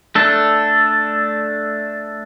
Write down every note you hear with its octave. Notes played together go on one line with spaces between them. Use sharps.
A3 D4 A4